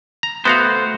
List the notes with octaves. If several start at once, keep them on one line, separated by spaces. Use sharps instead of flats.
A#5
A3 B3 F#4 C5 F5